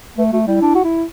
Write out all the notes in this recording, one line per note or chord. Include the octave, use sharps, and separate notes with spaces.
A3 B4
A3 F#4
G3 E4
D4
F#4
E4